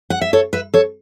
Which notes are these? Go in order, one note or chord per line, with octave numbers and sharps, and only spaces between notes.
F#5
E5
A4 C#5
B4 E5
A4 C#5